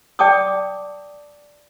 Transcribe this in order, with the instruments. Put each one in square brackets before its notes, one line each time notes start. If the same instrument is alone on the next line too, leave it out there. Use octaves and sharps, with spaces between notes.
[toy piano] D5 G5 A5 D6 D#6